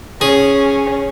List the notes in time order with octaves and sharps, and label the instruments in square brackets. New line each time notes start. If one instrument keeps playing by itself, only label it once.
[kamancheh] C#4 [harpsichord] G#4